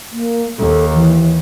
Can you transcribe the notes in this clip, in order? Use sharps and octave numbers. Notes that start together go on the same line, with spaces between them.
A#3
D#2 A4
E3